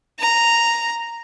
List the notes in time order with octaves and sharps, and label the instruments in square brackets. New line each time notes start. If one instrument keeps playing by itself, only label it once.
[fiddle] A#5